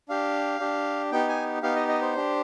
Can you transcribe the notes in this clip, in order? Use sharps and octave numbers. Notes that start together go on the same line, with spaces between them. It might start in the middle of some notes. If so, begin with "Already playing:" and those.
D4 G4 F5
D4 G4
B3 D#4 G4 G5
G#5
B3 D#4 G4 F5
D#5
D#5
C5
D4 G4